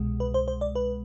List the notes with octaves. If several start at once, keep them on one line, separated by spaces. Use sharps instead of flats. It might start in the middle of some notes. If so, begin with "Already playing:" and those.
Already playing: C2 B2 G#3
B4
C5
C5
D5
B4